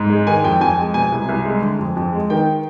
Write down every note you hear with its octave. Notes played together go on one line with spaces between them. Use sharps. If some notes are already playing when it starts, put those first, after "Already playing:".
Already playing: G#2
G#3
D#3 G#5
F2 G5
F2 G#5
G#3
B2 G#5
C2
C2
G#3
D3
F2
F2
G#3
D#3 G5